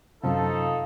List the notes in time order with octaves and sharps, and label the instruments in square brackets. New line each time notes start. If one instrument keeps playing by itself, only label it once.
[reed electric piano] F#2 C3 [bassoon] F3 [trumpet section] D#4 A4 [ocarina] F5